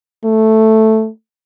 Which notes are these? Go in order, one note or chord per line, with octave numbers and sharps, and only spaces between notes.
A3